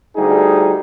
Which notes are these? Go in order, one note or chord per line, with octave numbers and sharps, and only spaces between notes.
D2 G3 D#4 G#4